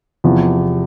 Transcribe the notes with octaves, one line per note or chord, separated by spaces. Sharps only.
E2 C3 F3